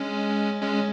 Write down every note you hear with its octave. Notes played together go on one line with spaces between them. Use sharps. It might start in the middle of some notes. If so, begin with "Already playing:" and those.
Already playing: G#3 C#4
G#3 C#4